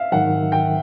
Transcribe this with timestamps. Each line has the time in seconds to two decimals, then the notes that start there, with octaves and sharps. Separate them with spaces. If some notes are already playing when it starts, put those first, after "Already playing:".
Already playing: E5 F5
0.12 G#2 D#3 F#3 F#5
0.52 G5